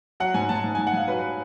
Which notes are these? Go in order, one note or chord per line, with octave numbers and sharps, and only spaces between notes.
F#3 F#5
G#2 G#5
G#2 A5
G#2 A5
G#2 G#5
F#5
G#2 F5
F#3 B4